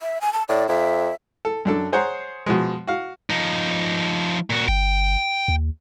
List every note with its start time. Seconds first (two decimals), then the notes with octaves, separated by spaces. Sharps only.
0.01 E5
0.21 G#5
0.33 A5
0.49 A2 D5
0.69 F2 E5
1.45 A4
1.65 F#2 D4 A4
1.92 G#4 C5 C#5 F#5 A#5
2.46 B2 F3 G#3
2.87 F#4 F5
3.30 F3 D#4
4.50 A#2 F#4
4.68 G1 G5
5.48 D#2